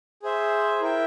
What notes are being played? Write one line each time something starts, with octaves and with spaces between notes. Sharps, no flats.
G#4 C5 E5
E4 A#4 E5 G5